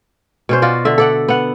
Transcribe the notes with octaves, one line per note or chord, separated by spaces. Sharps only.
B2 C#4 C5
F4 F#4 D5
D3 E5
A4 D5 F#5
B3 F#5